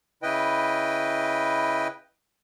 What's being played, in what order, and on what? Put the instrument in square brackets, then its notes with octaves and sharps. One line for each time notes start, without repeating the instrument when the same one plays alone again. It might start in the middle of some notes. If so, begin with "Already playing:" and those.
[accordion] C#3 E4 B4 D#5 G5